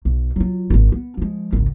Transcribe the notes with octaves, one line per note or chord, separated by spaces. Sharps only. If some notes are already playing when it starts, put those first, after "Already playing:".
B1
F#3 F4
D#1 G#1
B3
F3 G#3
G#1 C#2